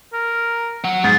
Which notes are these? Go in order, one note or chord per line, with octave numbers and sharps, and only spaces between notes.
A#4
F#3 F#5
G#2 G#4 A6